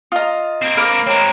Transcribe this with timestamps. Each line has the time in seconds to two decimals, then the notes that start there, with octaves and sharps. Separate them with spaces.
0.12 F4 D#5 A#5 D#6
0.62 A#3 C4
0.77 A#4 F5 B5 D6
1.07 G#3 C4 C#5 A#5